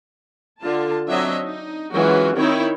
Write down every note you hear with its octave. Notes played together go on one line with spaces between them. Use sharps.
D3 F4 A5
F#3 C4 D4 C#5 D#5 E5
D#4
E3 F#3 G#3 C#4 F4 F#4
D#3 C4 D#4 E4 C#5 G5